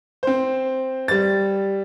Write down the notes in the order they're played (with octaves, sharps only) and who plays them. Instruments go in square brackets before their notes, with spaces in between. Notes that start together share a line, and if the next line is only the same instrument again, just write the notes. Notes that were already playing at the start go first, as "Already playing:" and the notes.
[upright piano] C4 C5
G3 A6